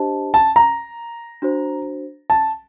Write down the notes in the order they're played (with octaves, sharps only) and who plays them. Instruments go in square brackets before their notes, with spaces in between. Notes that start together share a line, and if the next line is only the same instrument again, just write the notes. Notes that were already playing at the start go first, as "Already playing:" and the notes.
Already playing: [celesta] D4 G4 C5 D#5 A5
[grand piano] A5
A#5
[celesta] D4 F#4 C5
[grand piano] A5